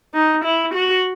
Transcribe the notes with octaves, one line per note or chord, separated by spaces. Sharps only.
D#4
E4
F#4